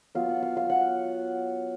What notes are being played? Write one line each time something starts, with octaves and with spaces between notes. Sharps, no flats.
F#3 B3 F4 F5
F#5
F5
F5
F#5